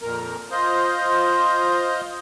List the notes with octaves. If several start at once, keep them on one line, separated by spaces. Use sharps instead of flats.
F2 A#2 A#4
F4 C5 D#5